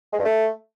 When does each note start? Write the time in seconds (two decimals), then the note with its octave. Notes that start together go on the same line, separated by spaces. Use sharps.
0.13 G#3
0.19 G2
0.25 A3